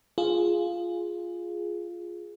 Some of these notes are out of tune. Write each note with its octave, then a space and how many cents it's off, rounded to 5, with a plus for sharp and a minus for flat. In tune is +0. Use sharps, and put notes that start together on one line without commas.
F4 +0 G#4 +0